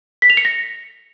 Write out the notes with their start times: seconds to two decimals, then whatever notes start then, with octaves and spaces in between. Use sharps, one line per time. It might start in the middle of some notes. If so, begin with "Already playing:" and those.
0.22 B6
0.30 F7
0.37 C#7
0.45 A#6